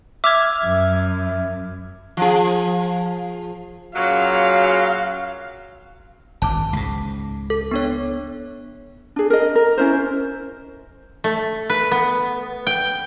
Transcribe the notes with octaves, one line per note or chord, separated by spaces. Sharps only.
E5 D6 F6 G#6
F#2
F3 G#4
A#2 C#3 F#3 F5
G#1 F#2 A5 D6
C#2 G#2
A4
B3 D4 C#5
D4 G#4
A#4 D#5
A#4
C#4 E4 A#4 C5
A3
B4
B3
G5